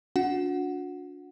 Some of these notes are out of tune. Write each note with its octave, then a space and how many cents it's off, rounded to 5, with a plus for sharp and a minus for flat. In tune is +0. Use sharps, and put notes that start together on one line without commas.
D4 -30 F#4 -45 F#5 +0